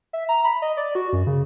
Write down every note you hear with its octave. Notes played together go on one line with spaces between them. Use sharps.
E5
A#5
B5
D#5
D5
F#4
F#2
C#3